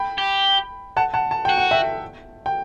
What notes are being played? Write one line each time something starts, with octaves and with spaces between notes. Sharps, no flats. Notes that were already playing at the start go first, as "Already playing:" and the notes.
Already playing: G5 B5
G4
F#5 A5
F#5 A5
A5
F#4 G5
F#5
E5 G5
G5